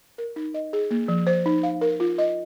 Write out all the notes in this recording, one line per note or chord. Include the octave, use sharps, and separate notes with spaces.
A#4
D#4
D#5
G#4
A#3
F3
C5
D#4
F5
A#4
F4
D#5